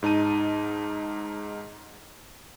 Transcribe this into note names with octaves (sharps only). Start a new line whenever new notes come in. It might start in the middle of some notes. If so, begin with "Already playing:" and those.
G#2 D#4 A5 D#7